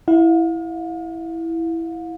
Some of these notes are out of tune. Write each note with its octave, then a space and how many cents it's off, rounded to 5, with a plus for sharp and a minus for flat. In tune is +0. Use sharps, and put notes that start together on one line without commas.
E4 +0 F5 +40